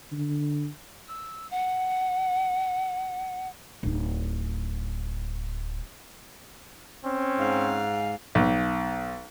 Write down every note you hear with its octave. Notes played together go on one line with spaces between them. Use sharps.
D3
E6
F#5
D1 D#4
C4 C#4
G#2 F5
B1